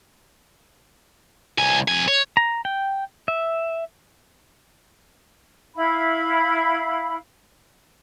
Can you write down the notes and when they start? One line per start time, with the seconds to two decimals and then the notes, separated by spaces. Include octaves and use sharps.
1.58 C2 G#5
1.88 F2 G#5
2.08 C#5
2.37 A#5
2.65 G5
3.28 E5
5.75 E4 F5 B5